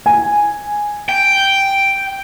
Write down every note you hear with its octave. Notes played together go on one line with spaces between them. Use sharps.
G#5
G5